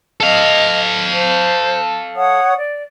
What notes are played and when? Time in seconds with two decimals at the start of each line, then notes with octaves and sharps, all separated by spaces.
0.20 A4 D#5 F5
1.13 C5
2.16 C#5 F#5 D#6
2.57 D5